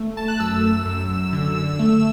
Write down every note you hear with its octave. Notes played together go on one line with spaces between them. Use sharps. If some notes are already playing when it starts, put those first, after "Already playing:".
Already playing: A3
A5
F#6
F#2 E6
F#2
D3
A3